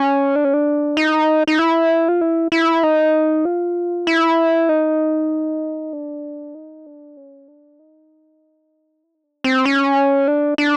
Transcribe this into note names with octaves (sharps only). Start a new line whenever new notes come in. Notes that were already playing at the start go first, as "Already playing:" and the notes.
Already playing: C#4
D4
C#4
D4
D#4
D#4
E4
F4
E4
E4
D#4
F4
E4
D#4
D4
D#4
D4
C#4
D4
D#4
E4
D#4
D4
C4
C#4
D4
D4